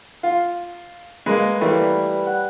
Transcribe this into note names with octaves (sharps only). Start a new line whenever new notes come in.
F4
G#3 A#3 B4
E3 G3 A3 A#3
F#5